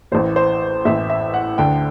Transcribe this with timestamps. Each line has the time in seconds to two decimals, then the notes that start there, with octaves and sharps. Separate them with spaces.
0.12 A1 A2 E3 C5
0.36 C5
0.85 A1 A2 E3 E5
1.10 E5
1.34 F#5
1.58 D2 D3 G5